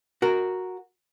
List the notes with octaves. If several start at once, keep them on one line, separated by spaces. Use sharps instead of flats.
F#4 A#4